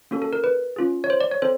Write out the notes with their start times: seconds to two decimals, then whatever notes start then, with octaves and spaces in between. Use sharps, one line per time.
0.11 A#3 C#4 F#4 A4
0.22 A4
0.33 A#4
0.44 B4
0.76 C#4 F4 G#4
1.04 C#5
1.10 C5
1.21 D5
1.31 C#5
1.42 C4 A4 C5